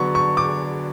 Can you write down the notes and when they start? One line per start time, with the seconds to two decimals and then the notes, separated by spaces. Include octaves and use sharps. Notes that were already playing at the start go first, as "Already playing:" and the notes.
Already playing: D3 F#3 B3 D4 C#6
0.15 C#6
0.37 D6